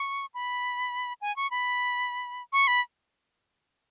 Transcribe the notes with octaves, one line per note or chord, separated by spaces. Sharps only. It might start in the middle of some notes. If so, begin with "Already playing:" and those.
Already playing: C#6
B5
G#5
C#6
B5
C#6
B5